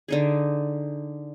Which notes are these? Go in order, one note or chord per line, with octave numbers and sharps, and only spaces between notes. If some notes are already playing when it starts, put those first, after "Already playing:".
D3 D#4 G#4